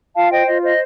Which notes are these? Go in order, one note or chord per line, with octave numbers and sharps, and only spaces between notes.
F4 F5 A5
C5 D#5 G5
F4 D#5
C5 D#5